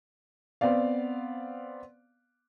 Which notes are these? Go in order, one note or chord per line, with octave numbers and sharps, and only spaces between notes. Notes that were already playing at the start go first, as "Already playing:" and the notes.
B3 C4 D5 F5